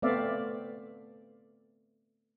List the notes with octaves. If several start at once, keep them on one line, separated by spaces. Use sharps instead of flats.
A3 B3 C4 D5 E5 F5